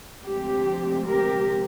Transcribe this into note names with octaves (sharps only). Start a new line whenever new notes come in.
D2 C3 F3 G#3 C4 G4
G4 A#4